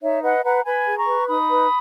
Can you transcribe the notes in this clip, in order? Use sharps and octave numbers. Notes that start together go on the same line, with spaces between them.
D#4 C#5 E5
B4 D#5 F#5
B4 F#5 A#5
B4 G#5 B5
G#4
A#5 C#6
B4
D#4 B5 D#6
B4